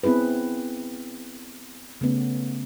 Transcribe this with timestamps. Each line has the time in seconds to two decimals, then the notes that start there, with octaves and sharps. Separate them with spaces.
0.03 B3 C4 E4 G#4 B4
2.01 C#3 A3 B3 C#4